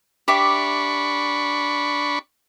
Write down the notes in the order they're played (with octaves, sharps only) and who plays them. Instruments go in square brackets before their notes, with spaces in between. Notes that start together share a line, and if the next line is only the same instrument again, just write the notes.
[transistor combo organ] D4 B5 C#6 [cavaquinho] G4 E5 D6